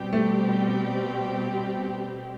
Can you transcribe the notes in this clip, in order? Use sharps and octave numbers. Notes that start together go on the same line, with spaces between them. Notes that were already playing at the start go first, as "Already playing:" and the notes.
Already playing: B2 G3 C4 G4
A3